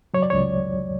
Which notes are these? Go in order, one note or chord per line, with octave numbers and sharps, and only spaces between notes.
F#3 C#5
D5
C#2 C#5